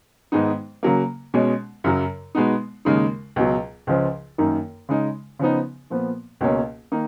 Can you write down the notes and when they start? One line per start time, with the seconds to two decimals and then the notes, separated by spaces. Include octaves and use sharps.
0.32 G#2 D#3 G#3 B3 D#4
0.83 C#3 F#3 A#3
1.34 B2 G#3 C#4
1.84 F#2 C#3 F#3
2.35 B2 G#3 B3 D#4
2.85 D#2 C#3 G#3 D#4
3.36 C#2 B2 F#3
3.87 C#2 C#3 F3
4.38 F#2 D#3 A#3 D#4
4.89 C#3 G#3 D#4
5.39 C#3 F3 B3 D#4
5.90 A#2 F3 B3
6.41 C#2 B2 A#3 C#4
6.92 D#3 A#3 D#4